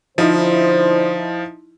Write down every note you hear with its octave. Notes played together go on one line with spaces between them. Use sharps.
D3 F3 D#4 E4 C5